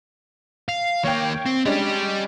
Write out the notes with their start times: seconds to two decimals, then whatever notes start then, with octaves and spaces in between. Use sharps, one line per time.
0.69 F5
1.04 D#2 A#3 C#5 G5
1.46 C4
1.66 G3 G#3 C#4 D4 G4